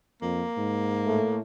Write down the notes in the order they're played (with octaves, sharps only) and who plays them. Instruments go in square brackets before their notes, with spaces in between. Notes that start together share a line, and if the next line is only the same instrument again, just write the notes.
[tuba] F2 [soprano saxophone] A#3
[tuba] G#2
[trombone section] A2 A3